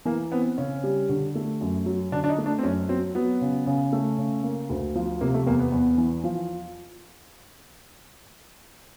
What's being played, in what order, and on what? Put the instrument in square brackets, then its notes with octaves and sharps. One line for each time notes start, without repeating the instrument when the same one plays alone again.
[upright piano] E3 [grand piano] A#3
[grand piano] B3 [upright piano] C4
[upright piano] C#3 [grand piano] C#4
[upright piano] G3
D3
A3
F#2
F#3
[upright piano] D3 [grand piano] D4
[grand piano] D4
D#4
[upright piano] A3
[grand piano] D4
C4
[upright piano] F#2 [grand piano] C#4
[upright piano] F#3 [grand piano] C4
[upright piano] F#3 [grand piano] B3
[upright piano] C#3
C#3
A3
C#3
A#3
D2
F3
[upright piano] C3 [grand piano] A#3
[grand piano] A3
[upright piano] E2 [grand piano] A#3
[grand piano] B3
[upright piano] E2
E3
F3